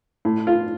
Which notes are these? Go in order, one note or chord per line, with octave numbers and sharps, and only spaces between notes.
A2
F4